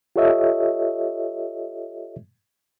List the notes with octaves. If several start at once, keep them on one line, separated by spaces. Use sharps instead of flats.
F4 G4 A4 C#5 D#5 E5